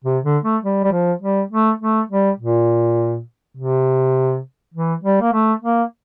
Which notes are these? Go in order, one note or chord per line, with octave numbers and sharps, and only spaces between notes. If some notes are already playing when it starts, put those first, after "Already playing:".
C3
D3
A3
G3
G3
F3
G3
A3
A3
G3
A#2
C3
E3
G3
A#3
A3
A#3